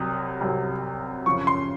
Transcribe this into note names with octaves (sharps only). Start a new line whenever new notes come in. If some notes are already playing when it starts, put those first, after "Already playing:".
Already playing: C2 C3 F#3 D#6
C2 C3 F#3
F#2 C#3 F3 C#6
C6